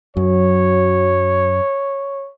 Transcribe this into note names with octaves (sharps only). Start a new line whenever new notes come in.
F#2 F#3 C#5